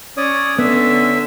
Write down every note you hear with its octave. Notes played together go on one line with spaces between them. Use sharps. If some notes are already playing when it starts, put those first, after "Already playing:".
C#4 C#5 D5 D#6
D3 B3 E5